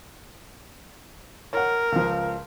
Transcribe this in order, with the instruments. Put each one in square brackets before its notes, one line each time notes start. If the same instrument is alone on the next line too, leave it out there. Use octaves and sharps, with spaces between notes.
[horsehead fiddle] A#4 [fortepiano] C#5 F#5
[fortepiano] C#2 F3